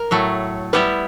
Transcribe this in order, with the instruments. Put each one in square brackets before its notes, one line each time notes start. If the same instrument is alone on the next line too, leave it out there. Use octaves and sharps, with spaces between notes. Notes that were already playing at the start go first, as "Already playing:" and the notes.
Already playing: [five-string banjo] A#4
[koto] A2 F#3 A3
[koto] G3 B3 E4 G4 [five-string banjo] B4